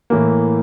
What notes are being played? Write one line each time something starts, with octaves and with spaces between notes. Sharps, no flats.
A2 E3 A#3